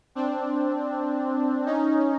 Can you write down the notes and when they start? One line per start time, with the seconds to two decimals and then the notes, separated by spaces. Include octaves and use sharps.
0.15 C4 D4
1.66 C#4 D#4